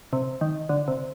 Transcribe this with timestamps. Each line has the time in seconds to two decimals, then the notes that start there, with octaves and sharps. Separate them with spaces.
0.13 C3
0.41 D#3
0.69 D3
0.88 C3